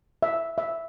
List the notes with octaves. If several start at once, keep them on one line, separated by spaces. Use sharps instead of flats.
E5
E5